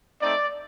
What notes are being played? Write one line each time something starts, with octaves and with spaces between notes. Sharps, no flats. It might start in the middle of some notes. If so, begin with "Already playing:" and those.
A3 C4 D#4 D5